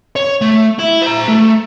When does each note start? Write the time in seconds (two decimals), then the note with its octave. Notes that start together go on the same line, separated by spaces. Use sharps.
0.16 C#5
0.41 A3
0.79 E4
1.02 C5 A#5
1.28 A3